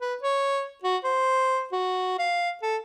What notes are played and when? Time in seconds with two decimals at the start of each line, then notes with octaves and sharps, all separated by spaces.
0.01 B4
0.23 C#5
0.83 F#4
1.04 C5
1.72 F#4
2.19 F5
2.62 A4